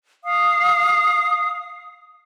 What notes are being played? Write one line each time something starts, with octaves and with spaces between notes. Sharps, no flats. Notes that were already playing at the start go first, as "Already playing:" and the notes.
F5 D#6